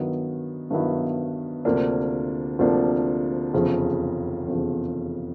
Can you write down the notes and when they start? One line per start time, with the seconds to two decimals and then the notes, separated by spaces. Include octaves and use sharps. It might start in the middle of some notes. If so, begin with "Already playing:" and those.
Already playing: G2 D#3 F#3 B3 E4
0.70 G2 D#3 F#3 B3 E4
1.65 D2 C3 F3 A#3 D4
2.59 D2 C3 F3 A#3 D4
3.54 F1 E2 C#3 F3
4.47 F1 E2 C#3 F3